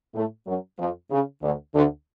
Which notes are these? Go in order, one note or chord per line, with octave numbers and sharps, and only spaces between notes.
A2 A3
F#2 F#3
F2 F3
C#3
D2 D3
D2 D3